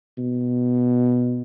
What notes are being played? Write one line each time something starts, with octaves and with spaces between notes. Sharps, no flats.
B2